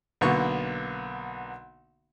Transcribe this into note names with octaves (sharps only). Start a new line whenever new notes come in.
B1 D3 A#3 B3 C#6